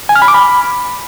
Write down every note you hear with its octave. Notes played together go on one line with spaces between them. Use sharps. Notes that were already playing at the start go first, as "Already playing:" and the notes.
G#5
F6
B5
D6
B5